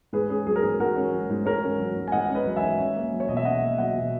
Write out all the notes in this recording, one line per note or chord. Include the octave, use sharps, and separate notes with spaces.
G#2 G#4 B4
C#4 G#4
F#3 G#4
A#4
G#2 G#4
G#2 F#4 A#4
C#4
F#3
G#2
G#2 A#4 C#5
C#4
F#3
G#2
G#5
G#2 D#5 F#5
C#4
B4 D#5
F#3
E5 G#5
G#2
C#4
A#3
F#3
C#5
B2 D#5
E5
C#4 D#5 F#5
A#3
F#3 D#5 F#5
B2